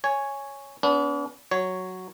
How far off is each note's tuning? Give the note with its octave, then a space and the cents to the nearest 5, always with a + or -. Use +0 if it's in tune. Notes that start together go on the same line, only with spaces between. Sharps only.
C#5 +0 G#5 +0
B3 +0 D4 -45
F#3 +0 C#5 +0